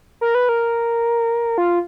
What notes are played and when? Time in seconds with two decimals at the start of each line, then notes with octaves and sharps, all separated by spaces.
0.21 A#4
0.35 B4
0.49 A#4
1.58 F4